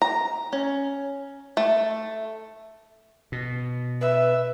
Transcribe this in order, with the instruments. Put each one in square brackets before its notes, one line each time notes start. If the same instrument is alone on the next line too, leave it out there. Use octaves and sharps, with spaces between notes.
[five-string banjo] A#5
C#4
A3
[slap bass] B2
[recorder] B4 [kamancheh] E5